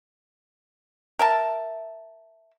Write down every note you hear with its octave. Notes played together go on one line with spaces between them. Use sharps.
A#4 E5 A5